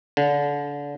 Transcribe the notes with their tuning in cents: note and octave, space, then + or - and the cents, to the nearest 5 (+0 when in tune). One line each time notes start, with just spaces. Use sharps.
D3 -30